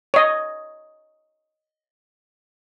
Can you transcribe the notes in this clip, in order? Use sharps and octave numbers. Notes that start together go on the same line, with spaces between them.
C#5 D#5